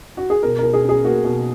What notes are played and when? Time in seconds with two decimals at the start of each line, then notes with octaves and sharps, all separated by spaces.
0.17 F#4
0.30 G#4
0.43 B2 A#4
0.59 A#4
0.64 B2
0.73 G#4
0.84 C#4
0.89 G#4
1.04 A#3 F#4
1.25 B2